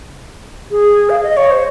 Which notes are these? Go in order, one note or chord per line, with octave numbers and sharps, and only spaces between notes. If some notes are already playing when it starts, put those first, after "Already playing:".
G#4
F5
D#5
C#5
C5